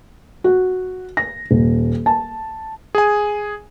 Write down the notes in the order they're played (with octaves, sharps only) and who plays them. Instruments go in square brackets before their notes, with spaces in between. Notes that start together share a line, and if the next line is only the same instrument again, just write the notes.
[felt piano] F#4
A#6
D#1
A5
[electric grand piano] G#4 G#5